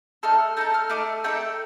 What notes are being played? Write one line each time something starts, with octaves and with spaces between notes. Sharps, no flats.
A3 D#4 A4 F6
A3 D#4 A4 G6
F6
A3 D#4 A4 D6
A3 D#4 A4 G5